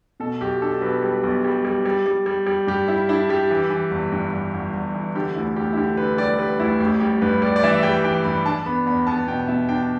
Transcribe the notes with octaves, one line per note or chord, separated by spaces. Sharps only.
B2 A4
B1 G4
D4 A4
B1 B4
G3
B1
G3
G3
G3
G3
G3
G3
G2 G4
G3 E4
D4 E4
G3 G4
E3
E3
G1
G2
G1
G1
G1
E3
D3 G4
D2 E4
D2 G4
E4
D3 G4
D3 B4
G3 D5
G3 B4
D2 E4
A1 G4
G3 G4
G2 B4
G3 D5
D5
E3 E5
E5
G3 G5
E3 G5
G2 B5
D4 A5
B3 B5
E2 B5
B3 A5
B2 G5
B2 E5
D4 G5